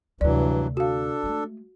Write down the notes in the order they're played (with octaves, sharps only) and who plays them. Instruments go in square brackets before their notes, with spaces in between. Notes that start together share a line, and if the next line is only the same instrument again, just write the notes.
[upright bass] D2 C3 [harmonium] G2 E3 F#3 [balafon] D5
[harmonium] D4 A4 [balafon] F#4 F5
[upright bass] G#3 A3